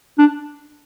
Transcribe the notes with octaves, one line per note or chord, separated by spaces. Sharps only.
D4